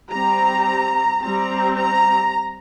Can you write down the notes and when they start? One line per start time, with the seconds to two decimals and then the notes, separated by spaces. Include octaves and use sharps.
0.11 G3 C4 A#5
1.22 G3 C4 A#5
1.78 A#5